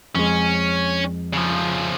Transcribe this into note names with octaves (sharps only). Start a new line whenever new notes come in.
F2 G#3 C#4
C#3 F3